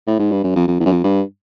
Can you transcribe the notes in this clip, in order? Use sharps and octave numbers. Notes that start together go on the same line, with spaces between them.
A2
G#2
G2
F#2
F2
F2
E2
F#2
F2
G2